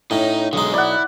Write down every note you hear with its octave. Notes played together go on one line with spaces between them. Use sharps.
A2 C#4 D#4
B1 D3 G#3 D#4
E4 D5 F#5